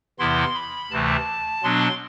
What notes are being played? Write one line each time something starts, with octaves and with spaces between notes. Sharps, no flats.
E2 C3 E3 B3 E4 C6
B5
D2 C3 E3 A3 A5
B2 F#3 B3 D4 C6